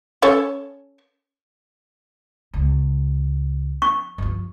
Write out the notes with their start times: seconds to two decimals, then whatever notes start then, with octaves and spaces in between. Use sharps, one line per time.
0.22 C#4 A4 C#5
2.54 C#2
3.82 C#6
4.18 G2 F3